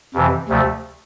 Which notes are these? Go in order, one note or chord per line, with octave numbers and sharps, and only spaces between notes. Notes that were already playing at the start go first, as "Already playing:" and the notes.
F2 C3 E3
D2 C3 F3 A3